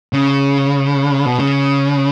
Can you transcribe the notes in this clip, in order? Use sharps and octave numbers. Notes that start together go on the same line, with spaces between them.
C#3
B2
C#3